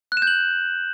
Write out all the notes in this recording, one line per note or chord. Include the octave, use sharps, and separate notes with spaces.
F#6
E7
G6
F#7